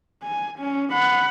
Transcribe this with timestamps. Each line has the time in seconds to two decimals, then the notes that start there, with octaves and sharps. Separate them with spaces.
0.23 G#5
0.59 C#4
0.92 F#5 B5